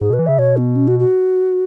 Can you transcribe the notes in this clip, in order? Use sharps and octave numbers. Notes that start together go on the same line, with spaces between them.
G#2 G#4
B2 B4
E3
C#3 E5
B2 C#5
B3
C#4
F#4
F#4